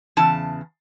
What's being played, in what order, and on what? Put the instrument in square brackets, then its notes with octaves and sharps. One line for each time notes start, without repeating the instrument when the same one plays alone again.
[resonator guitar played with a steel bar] E2 C#3 A5